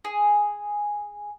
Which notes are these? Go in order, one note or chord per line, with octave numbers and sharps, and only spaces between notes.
G#4